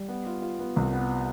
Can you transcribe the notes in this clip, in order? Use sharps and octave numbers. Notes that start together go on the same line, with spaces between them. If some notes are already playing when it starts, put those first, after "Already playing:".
Already playing: G3
B3
F4
F4
B3
C2
B3